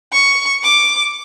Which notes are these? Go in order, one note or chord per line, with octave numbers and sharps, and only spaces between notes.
C#6
D6